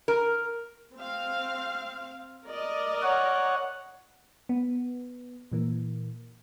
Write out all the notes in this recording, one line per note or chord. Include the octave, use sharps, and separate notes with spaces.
A#4
C4 F5
A#4 D5 D#5
C#5 F#5
B3
A#2 E3 A#3